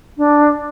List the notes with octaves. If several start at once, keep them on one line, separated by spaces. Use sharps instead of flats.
D4